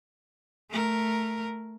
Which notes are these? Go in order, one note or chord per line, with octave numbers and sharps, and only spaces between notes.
A3 A#4